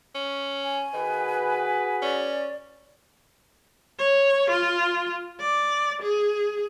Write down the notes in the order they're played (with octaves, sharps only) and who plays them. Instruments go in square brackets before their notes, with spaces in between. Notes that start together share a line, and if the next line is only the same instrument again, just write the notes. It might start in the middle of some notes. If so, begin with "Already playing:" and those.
[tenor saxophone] C#4
[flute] G#5
[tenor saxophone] D#3 [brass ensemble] F#4 G#4 B4
[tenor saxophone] C#4 [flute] D5
[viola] C#5
F4
D5
G#4